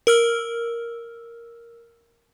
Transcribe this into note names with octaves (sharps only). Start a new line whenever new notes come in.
A#4 E6 F6